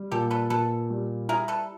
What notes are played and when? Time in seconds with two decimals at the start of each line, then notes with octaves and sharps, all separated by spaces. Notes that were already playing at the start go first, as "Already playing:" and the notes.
Already playing: G3
0.11 A#2 G4 A4
0.31 A4 B4
0.50 A#2 A4 B4
0.90 G3
1.29 E4 G#4 A#4
1.48 A4 B4